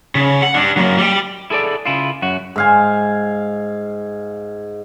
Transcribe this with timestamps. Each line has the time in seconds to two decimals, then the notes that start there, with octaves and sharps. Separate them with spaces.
0.15 C#3
0.42 F#5
0.55 G3 D4
0.77 F#3 A#3
0.98 G3 G5
1.50 E4 G#4 A4 B4 D5
1.85 C#3 E4 F4
2.22 F#2 F#4
2.56 G#2 F5 G#5